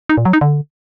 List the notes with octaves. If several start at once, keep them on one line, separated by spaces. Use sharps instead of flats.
D#4
A#2
F#3
D#4
D3